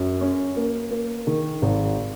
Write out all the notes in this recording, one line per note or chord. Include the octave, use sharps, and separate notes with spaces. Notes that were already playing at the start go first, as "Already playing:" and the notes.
Already playing: F#2
C#4
A#3
A#3
D#3
G#1